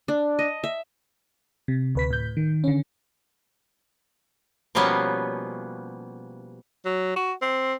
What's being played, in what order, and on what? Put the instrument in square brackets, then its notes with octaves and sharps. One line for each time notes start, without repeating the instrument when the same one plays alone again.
[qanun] D4
D#5
E5
[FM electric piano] C3
D2 B4 B6
A2 G6
D#3
D3 C#4
[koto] B2 F3 G3 A#3 B3 C#4
[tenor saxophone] F#3
F#4
C4